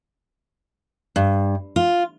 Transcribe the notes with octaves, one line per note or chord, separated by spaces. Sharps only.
G2
F4